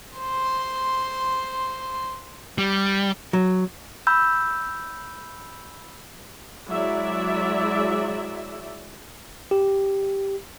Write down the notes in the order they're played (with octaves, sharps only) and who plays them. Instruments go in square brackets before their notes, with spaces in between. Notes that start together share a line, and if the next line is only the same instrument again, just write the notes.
[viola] C5 C6
[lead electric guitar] G3
[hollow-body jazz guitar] F#3
[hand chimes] B5 E6 G6
[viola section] F#3 G#3 E4 D5 E5
[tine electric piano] G4